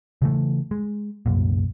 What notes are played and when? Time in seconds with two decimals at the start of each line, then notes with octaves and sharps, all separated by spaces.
0.22 C#3 E3 A3
0.71 G#3
1.26 C2 F#2 A#2